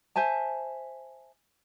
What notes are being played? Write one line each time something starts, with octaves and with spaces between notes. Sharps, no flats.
C5 E5 G#5 A5